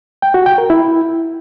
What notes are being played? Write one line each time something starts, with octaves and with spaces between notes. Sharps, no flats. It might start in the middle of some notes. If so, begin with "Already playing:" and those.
G5
F#4
G5
A#4
E4